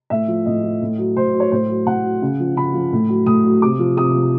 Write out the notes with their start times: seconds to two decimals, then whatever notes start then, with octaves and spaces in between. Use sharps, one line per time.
0.10 A2 E5
0.28 F3
0.45 A2 D#5
0.63 F3
0.82 A2
0.98 F#3
1.17 A2 C5
1.34 F#3
1.40 C#5
1.52 A2 C5
1.70 F#3
1.86 A2 F#5
2.04 F#3
2.22 C#3
2.40 F3
2.56 C#3 B5
2.74 F3
2.92 A2
3.09 F#3
3.26 A2 D#6
3.45 F#3
3.62 C3 D6
3.79 F3
3.97 C3 D#6
4.14 F3